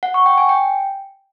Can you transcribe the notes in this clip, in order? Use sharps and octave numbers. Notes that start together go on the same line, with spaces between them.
F#5
C#6
G5
G#5
G5